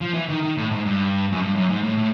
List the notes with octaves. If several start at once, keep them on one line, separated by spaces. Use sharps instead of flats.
F3
E3
D#3
D#3
A2
G#2
G2
F#2
G2
F#2
G#2
A2
A2